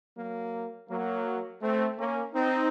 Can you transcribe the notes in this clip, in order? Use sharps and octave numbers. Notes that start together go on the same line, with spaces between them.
F#3 A#3
F#3 A#3
A3 C4
A#3 C#4
C4 D#4